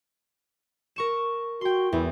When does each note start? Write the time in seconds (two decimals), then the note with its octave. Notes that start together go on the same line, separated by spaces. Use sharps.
0.96 A#4 C#6 E7
1.61 F#4 G5 C6
1.93 E2 E4